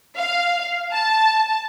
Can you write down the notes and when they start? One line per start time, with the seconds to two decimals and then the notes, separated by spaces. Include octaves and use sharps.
0.17 F5
0.92 A5